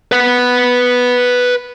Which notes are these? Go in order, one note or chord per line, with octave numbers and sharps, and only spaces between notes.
B4 F#5